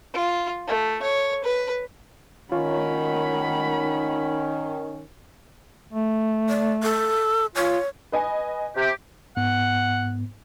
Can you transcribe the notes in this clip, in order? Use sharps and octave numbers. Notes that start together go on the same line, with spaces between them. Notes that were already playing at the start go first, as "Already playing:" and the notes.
F4
A3
C#5
B4
D#3 C#4 F4 C#5 F#5 B5
A3
D5
A4
F4 C#5
B4 D#5 G#5
C3 G4
G#2 B3 F#5